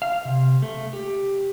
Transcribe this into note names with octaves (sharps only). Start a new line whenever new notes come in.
F5
C3
A3
G4